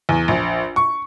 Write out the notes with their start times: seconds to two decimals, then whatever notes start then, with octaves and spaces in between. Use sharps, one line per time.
0.09 E2
0.28 A#1
0.76 C#6